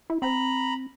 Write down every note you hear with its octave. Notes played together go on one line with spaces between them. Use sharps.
E4
C4 A#5 B5